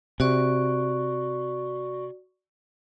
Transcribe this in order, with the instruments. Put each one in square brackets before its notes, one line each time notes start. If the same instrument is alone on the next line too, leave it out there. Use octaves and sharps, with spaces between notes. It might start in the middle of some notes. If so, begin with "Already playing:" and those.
[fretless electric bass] C3 [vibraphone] F#4 D5 C#6